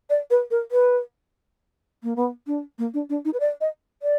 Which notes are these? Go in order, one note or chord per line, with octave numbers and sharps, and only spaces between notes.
D5
B4
A#4
B4
A#3
B3
D4
A#3
D4
D4
D#4
B4
D5
D#5
D5